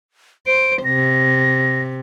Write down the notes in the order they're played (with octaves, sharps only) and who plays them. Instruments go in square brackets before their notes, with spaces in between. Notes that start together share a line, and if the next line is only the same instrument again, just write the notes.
[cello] C5 [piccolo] D7
[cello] C3 [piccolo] A#6